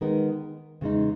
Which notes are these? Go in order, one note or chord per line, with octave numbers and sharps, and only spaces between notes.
D#3 G#3 B3 D#4 A#4
E2 C#3 G#3 D#4